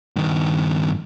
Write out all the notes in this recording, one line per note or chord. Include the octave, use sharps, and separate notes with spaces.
G2 D#3